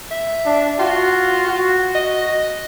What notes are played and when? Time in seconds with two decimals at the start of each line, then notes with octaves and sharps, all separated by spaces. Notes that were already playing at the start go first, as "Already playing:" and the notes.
0.11 E5
0.46 D4
0.79 F4 F#4
1.47 F#4
1.95 D#5